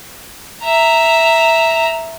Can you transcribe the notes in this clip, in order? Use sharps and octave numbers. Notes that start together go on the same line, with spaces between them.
E5 A#5